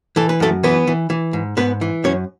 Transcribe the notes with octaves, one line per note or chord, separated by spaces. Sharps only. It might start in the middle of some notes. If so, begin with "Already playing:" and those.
E3 A4
B4
F#2 A3 A4
E3 B3 B4
E3
E3
G#2
G#2 B3 B4
E3
F#2 C#4 C#5